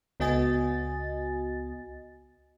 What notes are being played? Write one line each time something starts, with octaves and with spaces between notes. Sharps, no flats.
C#2 B3 F#4 D#5 G#5 A6